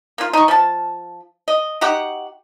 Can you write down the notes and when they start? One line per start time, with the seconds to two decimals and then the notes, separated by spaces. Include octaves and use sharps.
0.18 A#3 F4
0.33 D#4 C#6
0.48 F3 A5
1.48 D#5
1.81 D#4 F#4 G4 F#5